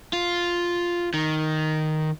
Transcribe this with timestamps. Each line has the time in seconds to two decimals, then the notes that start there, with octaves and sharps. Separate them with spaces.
0.13 F4
1.14 D#3